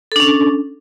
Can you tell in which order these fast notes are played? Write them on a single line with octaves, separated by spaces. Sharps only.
A4 D4 C#4